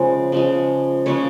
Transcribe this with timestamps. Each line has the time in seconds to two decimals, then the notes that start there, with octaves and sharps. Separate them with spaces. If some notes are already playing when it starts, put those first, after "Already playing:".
Already playing: C#3 F3 G#3 C5
0.32 C#3 F3 G#3
1.06 C#3 F3 G#3 C#5